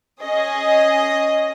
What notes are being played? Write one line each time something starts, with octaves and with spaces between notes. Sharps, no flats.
C#4 G#4 D#5